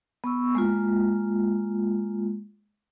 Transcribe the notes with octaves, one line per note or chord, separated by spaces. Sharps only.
B3 C#6 E6
G#3 A#3 F4